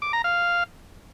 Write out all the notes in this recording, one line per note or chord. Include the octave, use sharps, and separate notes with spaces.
D6
A#5
F5